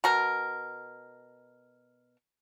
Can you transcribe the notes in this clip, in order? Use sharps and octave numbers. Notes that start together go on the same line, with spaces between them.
B2 A#4